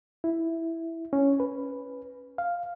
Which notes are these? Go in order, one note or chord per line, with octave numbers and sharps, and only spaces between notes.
E4
C#4
B4
F5